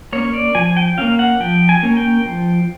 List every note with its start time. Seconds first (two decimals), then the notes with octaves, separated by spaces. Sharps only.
0.13 A#3 C#4 C#5
0.34 D5
0.55 F3 G#5
0.77 G5
0.98 A#3 C#4 F5
1.19 F#5
1.40 F3 G5
1.69 G#5
1.83 A#3 C#4
1.97 G5
2.26 F3